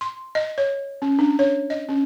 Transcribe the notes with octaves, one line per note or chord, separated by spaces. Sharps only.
C6
D#5
C#5
C#4
D4
C#5
D#5
C#4